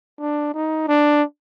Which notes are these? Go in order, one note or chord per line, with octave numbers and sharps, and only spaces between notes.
D4
D#4
D4